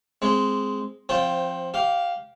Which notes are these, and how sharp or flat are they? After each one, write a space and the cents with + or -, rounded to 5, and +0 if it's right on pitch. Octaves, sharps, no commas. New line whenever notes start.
G#3 +0 C4 +0
F3 +0 C4 +15 G5 -15
G4 -20 F5 +5